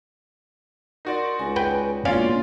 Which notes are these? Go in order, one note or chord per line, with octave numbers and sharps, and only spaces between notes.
D#4 F#4 A#4 D5 C6
C#2 G#5
B4 G5
E1 A#3 C#4 F4 D5 F5